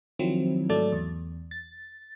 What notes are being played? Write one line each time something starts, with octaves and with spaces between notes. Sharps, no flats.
D#3 F3 F#3 C4 E4
G#2 F#3 A3 A4 D5 A6
E2
A6